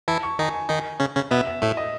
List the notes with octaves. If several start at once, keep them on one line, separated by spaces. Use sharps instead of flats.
E3 E4 A5
C#6
D#3 D#4 G#5
G#5
D#3 D#4
C#3 C#4
C#3 C#4
B2 B3 E5
E5
A2 A3 E5
D#5